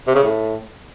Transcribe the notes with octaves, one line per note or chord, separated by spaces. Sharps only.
C3
C#3
A2